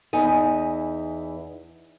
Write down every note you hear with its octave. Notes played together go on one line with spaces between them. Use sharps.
E2 E3 D#4 G#5